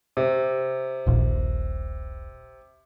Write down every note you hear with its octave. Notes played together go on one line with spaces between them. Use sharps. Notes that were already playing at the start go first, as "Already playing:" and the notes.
C3
D#1 A#1